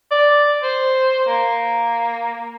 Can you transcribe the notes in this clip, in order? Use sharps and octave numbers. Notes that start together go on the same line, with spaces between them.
D5
C5
A#3